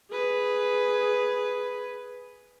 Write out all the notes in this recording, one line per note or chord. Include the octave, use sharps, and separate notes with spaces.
G#4 B4